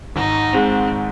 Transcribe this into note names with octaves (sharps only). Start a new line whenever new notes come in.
G#1 D#4
G#2 G#3 C4